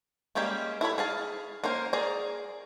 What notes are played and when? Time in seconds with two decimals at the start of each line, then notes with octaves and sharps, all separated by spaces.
0.35 G3 G#3 A#3 C#4 G4
0.81 E4 A4 C#5 B5
0.98 G#4 F5 A5
1.64 A#3 C#4 A#4 C5
1.93 G#4 A#4 D5 A#5